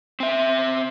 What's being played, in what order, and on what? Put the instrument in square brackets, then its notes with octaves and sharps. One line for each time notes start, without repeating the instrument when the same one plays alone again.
[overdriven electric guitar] C4 E5